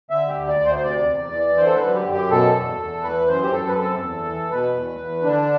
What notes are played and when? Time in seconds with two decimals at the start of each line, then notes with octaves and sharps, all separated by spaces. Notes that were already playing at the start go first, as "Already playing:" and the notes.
0.10 D3 E5
0.28 G4
0.35 D2
0.47 D5
0.60 D2
0.65 C5
0.76 C5
0.84 C3 D5
1.08 E2
1.32 E3
1.56 D3 C5
1.66 A4
1.75 B4
1.81 F#2
1.94 G4
2.06 F#2
2.12 G4
2.30 B2 A4
2.55 E2
2.80 E2
3.03 E3 B4
3.28 F#2 C5
3.43 G4
3.52 F#2 A4
3.68 B4
3.77 C3 A4
4.02 E2
4.26 E3
4.51 B2 B4
4.74 E2
5.00 E2
5.23 D3 D4